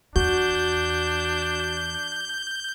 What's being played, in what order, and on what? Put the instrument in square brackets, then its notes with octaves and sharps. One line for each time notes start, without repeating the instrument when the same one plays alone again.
[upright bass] E2 [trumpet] D4 [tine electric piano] F#4 [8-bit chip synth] G6